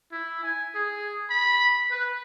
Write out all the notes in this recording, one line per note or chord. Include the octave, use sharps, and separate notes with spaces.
E4
G#5
G#4
B5
B4